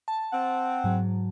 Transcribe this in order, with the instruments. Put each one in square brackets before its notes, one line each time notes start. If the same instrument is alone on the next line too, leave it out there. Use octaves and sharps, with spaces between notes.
[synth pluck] A5
[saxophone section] C4 F#5
[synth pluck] G#2 F#3